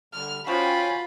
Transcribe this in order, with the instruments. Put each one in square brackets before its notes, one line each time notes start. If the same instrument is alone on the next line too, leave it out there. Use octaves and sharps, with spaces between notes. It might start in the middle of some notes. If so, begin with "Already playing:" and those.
[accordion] D3 G3 [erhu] F6
[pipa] F3 F#4 [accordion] C#4 G5 G#5 [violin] F4 [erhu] B5